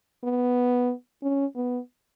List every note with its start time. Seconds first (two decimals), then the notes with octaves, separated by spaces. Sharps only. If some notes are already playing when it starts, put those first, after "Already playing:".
0.24 B3
1.23 C#4
1.56 B3